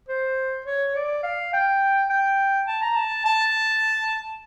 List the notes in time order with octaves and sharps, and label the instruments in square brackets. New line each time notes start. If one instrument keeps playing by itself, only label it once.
[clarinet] C5
C#5
D5
F5
G5
G5
A5
A#5
A5
A5